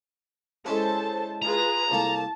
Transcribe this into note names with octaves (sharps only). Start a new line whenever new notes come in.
G#3 C#4 E4 A4 C5 A5
F4 G#4 B4 A#5
C2 A#3 A4 A5